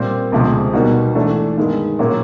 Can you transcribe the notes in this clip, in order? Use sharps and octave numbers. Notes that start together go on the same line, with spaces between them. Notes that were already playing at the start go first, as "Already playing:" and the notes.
Already playing: A#2 G3 C4
D2 C3 F3 G#3
B2 G3 A#3 D#4 F#4
G#2 E3 A3 D4
G2 D#3 G#3
A#2 F#3 A#3 C#4